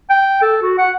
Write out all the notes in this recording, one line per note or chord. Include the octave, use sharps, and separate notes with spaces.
G5
A4
F#4
F#5